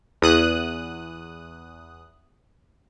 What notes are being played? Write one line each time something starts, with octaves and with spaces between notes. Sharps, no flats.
E2 D#6 F#6